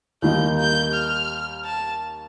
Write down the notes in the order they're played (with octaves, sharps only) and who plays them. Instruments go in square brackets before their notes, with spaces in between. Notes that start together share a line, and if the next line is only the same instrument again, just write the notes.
[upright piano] D#2 D#3 G3 A#3 D#4 [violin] G6
[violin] G6
F6
A5